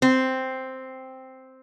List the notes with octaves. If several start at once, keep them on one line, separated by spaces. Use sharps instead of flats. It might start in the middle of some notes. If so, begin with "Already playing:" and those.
C4